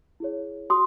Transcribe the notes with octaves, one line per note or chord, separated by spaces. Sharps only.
E4 G#4 C#5
F#4 C6 D#6